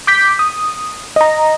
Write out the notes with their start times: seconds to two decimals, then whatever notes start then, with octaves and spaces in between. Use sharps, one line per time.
0.07 D6 G6 B6
0.39 D#6
1.16 D#5 A#5